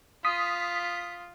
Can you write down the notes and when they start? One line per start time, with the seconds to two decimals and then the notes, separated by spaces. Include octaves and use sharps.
0.25 F4 D#6 B6